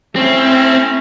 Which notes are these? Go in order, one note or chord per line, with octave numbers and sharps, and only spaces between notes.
A3 C4 C#4 E4